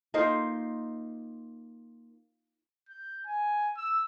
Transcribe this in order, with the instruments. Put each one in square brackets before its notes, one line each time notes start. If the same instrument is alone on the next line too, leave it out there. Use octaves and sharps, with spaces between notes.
[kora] A#3 D#4 F4 C5
[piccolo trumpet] G6
G#5
E6